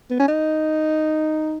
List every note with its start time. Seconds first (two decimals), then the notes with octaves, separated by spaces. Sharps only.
0.11 B3
0.20 C#4
0.28 D#4